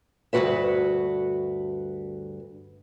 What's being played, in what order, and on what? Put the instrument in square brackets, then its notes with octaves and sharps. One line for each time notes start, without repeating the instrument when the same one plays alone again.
[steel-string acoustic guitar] D2 G2 D#3 F#4 B4 E5